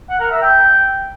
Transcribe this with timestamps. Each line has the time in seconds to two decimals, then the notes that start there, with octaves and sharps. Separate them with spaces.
0.10 F#5
0.21 A#4
0.31 E5
0.42 G5